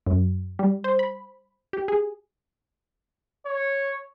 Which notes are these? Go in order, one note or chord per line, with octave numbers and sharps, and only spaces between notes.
F#2
G3
C5
B5
G4
G#4
C#5